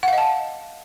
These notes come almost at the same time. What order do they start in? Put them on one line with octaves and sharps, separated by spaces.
F#5 F5 D#5 A5